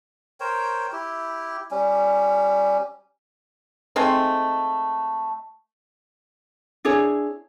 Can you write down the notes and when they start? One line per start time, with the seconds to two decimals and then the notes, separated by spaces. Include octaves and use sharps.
0.40 A#4 C5 C#5 G5
0.92 E4 G4
1.71 G3 C#4
3.96 G#3 A3 C4 D#4
6.85 D4 E4 G#4 C#5